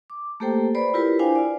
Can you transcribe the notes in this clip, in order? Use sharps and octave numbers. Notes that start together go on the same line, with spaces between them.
D6
A3 A#3 G4 A4 C5 G5
B4 C5 D5 B5
E4 F4 G4 A#4 B4
D4 E4 C5 F5 G5 G#5
F4 D5